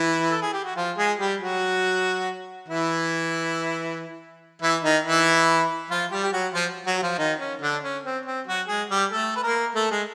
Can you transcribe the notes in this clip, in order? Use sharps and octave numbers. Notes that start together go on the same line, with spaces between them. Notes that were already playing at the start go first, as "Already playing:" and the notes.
Already playing: E3 E4
A4
G#4
G4
F#4
F3 F4
G#3 G#4
G3 G4
F#3 F#4
E3 E4
E3 E4
D#3 D#4
E3 E4
F3 F4
G3 G4
G4
F#3 F#4
F3 F4
F#3 F#4
F#4
F3 F4
D#3 D#4
C#4
D3 D4
C#4
C4
C4
F#3 F#4
G#3 G#4
G3 G4
A3 A4
B4
A#3 A#4
A3 A4
G#3 G#4